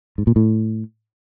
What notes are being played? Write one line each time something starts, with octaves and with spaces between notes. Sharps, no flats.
G#2
A#2
A2